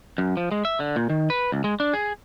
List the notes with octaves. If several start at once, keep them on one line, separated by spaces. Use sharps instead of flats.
F#2
F3
G#3
E5
D3
A#2
D#3
B4
C#2
G#3
D4
G#4